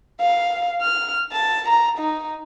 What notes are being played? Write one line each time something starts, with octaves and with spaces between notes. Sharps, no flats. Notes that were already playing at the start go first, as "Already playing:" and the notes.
F5
F6
A5
A#5
D#4